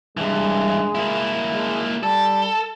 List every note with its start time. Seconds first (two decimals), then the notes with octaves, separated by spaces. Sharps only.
0.17 G2 E3 G#3
0.95 A#3 E4
1.53 G#3
2.03 G3 A4